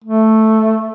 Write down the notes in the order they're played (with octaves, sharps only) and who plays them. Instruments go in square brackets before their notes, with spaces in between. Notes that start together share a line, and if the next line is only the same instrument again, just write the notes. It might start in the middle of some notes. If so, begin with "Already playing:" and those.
[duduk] A3